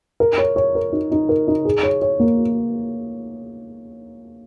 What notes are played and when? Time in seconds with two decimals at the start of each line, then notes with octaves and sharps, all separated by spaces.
0.20 A#4
0.38 C#5
0.56 C#5
0.75 A#4
0.92 D#4
1.11 D#4
1.29 A#4
1.48 D#4
1.65 G#4
1.83 C#5
2.02 C#5
2.20 A#3